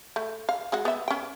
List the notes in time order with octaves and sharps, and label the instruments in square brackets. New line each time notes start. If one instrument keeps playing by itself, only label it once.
[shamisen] A3
F5
G#3 F#4 F#5
B3 E5
C#4 G5